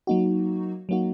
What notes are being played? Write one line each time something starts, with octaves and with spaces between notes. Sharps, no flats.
F#3 A#3 D#4 F#4
F#3 A#3 D#4 F#4